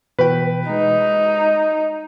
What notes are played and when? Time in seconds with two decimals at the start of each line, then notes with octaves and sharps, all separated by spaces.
0.19 B2 E3 B4 G5
0.70 G#3 D#4